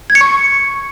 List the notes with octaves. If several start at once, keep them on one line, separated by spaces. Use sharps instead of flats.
G#6
C#7
C#6